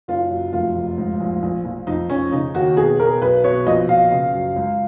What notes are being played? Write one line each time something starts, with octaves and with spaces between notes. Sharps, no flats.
F#1 F4
F#2
F1 F4
F1
G#2
A#1
A#1
A#1
F2 D#4
F2 C#4
C#3 D#4
D#2 F#4
B2 G#4
B2 A#4
B1 B4
B2 C#5
A#1 D#5
A#1 F5
C#3
F#2
C#2